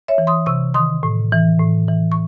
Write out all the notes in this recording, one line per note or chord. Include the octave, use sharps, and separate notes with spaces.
C#5 E5
E3
C6 D#6
C3 C#6 E6
D#3 C6 D#6
A2
E3
A2
E3
C#6